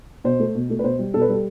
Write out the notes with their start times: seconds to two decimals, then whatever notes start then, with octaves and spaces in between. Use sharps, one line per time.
0.24 B2 C5
0.39 A3
0.55 B2
0.70 A3
0.79 B4
0.84 B2 C5
0.99 G3
1.14 B2 A4
1.21 B4
1.29 G3 A4